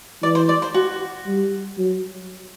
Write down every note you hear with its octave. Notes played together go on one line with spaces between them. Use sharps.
E3 D5
C5
D5
C5
F#4
G3
F#3